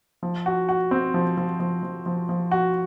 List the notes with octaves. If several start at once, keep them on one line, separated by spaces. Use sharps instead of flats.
F3
F#4
F#4
C4
F3
F3
F3
F3
F3
F3
F#4